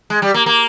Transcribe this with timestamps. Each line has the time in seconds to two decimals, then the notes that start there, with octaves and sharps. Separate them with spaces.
0.10 G#3
0.22 G3
0.34 A#3
0.46 A#3